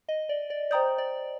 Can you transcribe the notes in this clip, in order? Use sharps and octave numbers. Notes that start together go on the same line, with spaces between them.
D#5
D5
D5
C5 D5 G5 A#5 D#6 G6
D5